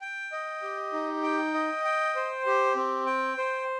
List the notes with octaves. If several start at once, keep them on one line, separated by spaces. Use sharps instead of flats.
G5
D#5
G4
D#4
G5
D#5
G5
C5
G4
C4
G5
C5